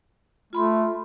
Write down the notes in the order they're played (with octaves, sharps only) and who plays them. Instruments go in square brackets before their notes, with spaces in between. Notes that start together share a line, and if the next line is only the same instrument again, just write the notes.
[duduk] A3 [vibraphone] F4 B5 C6